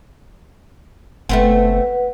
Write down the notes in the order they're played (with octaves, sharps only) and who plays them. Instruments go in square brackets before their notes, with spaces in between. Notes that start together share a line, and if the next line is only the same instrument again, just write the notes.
[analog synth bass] F#1 [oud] A3 B3 C4 [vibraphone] B4 F#5